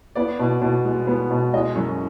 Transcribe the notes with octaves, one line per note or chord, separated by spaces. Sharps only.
B3 D5
B2
B2
G#3
B3
B2
G#3 D#5
F#2